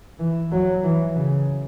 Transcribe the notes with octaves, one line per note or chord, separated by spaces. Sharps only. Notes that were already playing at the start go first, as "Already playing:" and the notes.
E3
F#3
E3
C#3